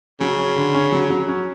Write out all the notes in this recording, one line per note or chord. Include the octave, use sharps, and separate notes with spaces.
C#3 F#3
C#4
D3
C#4
F#3
F#3
C#4